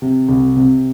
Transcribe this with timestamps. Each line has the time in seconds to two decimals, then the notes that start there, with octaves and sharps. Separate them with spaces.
0.02 C3
0.29 C2
0.57 C3